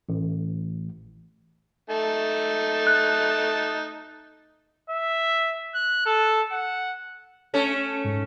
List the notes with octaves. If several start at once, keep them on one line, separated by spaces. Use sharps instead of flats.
A1
A3 D#4 A5
F#6
E5
F#6
A4
F#5
A3 C#4 A4
G#2